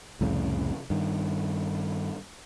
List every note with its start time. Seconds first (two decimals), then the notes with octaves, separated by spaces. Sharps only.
0.21 C2 F2 A2 C#3
0.90 G2 D#3